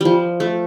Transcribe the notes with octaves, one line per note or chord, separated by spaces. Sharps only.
F3 G3
A3